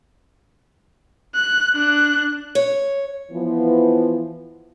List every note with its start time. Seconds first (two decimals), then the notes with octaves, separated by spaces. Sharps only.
1.35 F#6
1.75 D4 F#6
2.55 C#5
3.31 E3 F3 B3